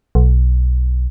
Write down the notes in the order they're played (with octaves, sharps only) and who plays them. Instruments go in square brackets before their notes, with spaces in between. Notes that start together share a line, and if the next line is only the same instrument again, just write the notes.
[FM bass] B1